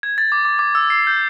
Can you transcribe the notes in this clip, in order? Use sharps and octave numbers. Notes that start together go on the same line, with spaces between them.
G#6
A6
D6
D6
D6
E6
C7
G6